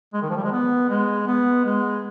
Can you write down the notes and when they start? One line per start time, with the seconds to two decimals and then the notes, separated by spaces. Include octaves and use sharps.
0.13 G#3
0.22 D#3
0.30 F3
0.37 G3
0.44 G#3
0.51 B3
0.89 G#3
1.27 B3
1.65 G#3